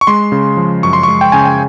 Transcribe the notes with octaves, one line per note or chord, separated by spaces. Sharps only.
C#6
G#3 C6
C#3
F3
F#2 C#6
C6
C#6
G#3
G5
C#3 G#5
G5